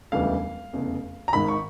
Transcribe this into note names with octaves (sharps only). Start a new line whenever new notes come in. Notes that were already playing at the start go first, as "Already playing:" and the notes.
E1 D2 C#3 E3 G3 F5
F1 E2 C#3
A#5
G#1 G#2 D#3 B5
C#6